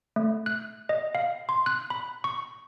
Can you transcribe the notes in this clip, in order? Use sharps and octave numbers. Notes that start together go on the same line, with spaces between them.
A3
F#6
D#5
F5
C6
F#6
B5
C#6